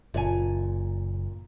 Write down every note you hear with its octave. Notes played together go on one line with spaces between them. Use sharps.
F#1 A#2 G#5